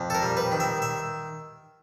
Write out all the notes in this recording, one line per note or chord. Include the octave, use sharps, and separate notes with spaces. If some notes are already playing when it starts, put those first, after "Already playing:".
Already playing: F2
A4
A#4
G3
B4
D#3
E5
E5